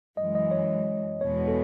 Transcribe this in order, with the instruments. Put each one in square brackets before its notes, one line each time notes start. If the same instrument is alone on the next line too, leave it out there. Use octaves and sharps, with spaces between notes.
[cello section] F#2 E3 G#3 [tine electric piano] D#5
[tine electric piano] D#5
C#5
[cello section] E2 B2 G#3 [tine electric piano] C#5
[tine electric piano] A4